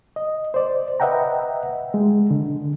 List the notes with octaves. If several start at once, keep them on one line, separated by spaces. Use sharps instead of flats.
D#5
C5 D5
B4 D#5 E5 F#5 G5 A#5
G#3
D3